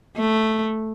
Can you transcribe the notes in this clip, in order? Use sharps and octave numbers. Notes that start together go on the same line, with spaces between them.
A3